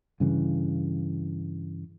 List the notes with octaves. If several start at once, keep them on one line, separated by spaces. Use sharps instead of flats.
G2 C#3 E3